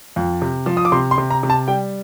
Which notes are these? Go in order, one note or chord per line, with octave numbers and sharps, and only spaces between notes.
F2
C3
F3
D#6
D6
C3 C6
C6
C3
A#5
C3
A5
G3 G5